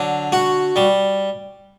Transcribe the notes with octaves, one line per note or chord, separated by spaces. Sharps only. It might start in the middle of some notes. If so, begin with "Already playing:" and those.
Already playing: D3 F#3
F#4
G3